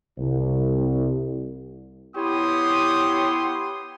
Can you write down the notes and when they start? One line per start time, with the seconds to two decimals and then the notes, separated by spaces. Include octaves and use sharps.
0.18 C2
2.16 B3 E4 G4 C#5 C6 D#6